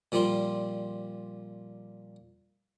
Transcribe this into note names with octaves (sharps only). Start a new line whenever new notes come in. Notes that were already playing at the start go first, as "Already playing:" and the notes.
A#2 F3 G3 D5 C6